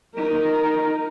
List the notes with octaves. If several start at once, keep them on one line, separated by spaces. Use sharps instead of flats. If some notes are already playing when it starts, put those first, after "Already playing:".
D#4 A#4